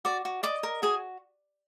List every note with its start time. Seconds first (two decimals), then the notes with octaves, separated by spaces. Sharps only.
0.05 F#4 D5 D6
0.25 F#4
0.43 D5 D#5 D6
0.63 A#4
0.82 F#4 G#4 G#5